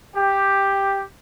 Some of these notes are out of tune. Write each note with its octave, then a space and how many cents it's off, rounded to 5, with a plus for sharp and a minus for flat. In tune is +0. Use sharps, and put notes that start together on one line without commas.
G4 +5